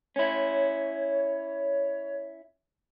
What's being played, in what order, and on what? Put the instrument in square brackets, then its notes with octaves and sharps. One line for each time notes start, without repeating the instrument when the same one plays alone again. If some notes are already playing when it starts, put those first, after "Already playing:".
[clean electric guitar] C#4 E4 [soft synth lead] C#5